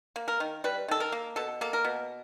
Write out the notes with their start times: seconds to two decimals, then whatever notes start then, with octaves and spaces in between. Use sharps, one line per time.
0.16 A#3
0.28 A#4
0.40 D#3
0.64 G3 B4
0.88 D#3 A4
1.00 A#4
1.12 A#3
1.36 B2 A4
1.61 A#3 A4
1.73 A#4
1.85 B2